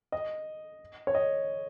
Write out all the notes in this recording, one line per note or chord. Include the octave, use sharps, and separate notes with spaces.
D#5
C#5
D#5